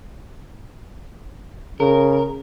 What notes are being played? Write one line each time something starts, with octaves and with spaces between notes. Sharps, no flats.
C#3 A#4